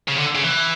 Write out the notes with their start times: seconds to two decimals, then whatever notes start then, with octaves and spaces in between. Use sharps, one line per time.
0.08 C#3
0.18 D3
0.35 C#3
0.43 E3